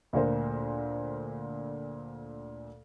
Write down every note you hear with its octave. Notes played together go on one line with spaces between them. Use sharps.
D2 A#2 A#4 C5